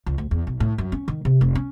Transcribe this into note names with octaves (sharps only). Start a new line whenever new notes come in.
C#2
D2
E2
B1
A2
F#2
C#4
D#3
C3
F1
C#4